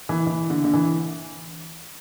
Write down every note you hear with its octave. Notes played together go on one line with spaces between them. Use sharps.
E3
E3
D3
D3
E3